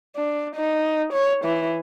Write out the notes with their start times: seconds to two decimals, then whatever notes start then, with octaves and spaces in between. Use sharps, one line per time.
0.16 D4
0.55 D#4
1.13 C#5
1.45 E3